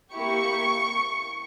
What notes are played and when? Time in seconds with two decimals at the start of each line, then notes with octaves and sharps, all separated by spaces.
0.12 A#3 E4 G4 C#6